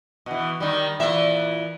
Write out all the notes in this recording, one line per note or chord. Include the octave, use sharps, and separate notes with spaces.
B2 E3
D#3 G3
A#2 E3 E5